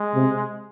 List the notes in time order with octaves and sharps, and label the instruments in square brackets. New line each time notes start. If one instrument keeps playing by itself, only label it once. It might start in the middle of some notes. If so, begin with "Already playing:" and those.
Already playing: [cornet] G#3
[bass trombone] C3